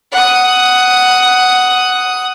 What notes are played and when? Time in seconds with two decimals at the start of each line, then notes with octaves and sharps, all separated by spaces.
0.12 F#5 D#6